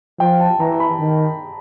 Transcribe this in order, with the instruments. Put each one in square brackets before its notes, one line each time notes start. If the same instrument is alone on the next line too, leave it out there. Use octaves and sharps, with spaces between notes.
[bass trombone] F3 [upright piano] G5
[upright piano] A5
[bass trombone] E3 [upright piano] A#5
[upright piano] B5
[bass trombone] D#3